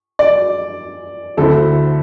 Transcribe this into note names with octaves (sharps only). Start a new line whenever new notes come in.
D5
D2 D3 C4 E4 A4